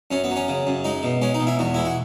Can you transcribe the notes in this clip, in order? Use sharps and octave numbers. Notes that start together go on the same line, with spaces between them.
F#2 C#4
B3
F#3
C#4
C#3
F#2
G#3 D#4
B2
G#3 C#4
D#4
B2
E4
E2 F#4
G#3 E4
F#4